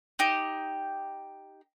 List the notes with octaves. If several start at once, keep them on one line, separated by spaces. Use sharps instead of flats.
D#4 G4